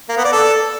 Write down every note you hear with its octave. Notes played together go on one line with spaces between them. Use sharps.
A#3
B3
D5
A4